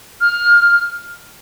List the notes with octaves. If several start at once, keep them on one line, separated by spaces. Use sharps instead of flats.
F6